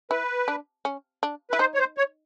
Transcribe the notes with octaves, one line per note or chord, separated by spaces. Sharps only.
E4 B4
D4
C#4
D4
E4 B4
D#4 C5
C#5
C5
C#5